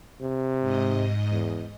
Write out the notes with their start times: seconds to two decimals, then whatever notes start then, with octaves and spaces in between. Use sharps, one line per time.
0.21 C3
0.61 G#2 D#5
1.31 E2